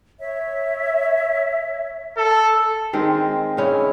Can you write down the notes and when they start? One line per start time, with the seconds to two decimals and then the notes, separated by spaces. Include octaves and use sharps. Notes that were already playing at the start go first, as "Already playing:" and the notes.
0.20 C#5 E5
2.17 A4
2.93 D#3 G#3 C4
3.57 C#3 C#4 E4